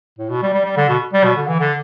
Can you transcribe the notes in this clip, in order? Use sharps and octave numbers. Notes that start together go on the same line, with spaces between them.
A2
B2
G3
G3
G3
D3
B2
G3
B2
D3
E3
D3